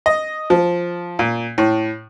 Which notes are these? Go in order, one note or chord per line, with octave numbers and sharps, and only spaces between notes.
D#5
F3
A#2
A2